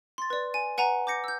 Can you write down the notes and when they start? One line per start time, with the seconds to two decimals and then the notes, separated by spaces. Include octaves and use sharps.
0.18 C6 A6
0.30 B4 D5
0.54 G#5 D#7
0.78 B4 F#5 G#5 A#5
1.07 D6 G6 A#6 C#7
1.24 E6 G6